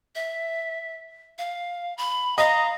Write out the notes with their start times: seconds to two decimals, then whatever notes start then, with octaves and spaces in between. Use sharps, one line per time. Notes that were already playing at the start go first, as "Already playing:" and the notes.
0.15 E5
1.38 F5
1.98 B5
2.38 D#5 F5 A#5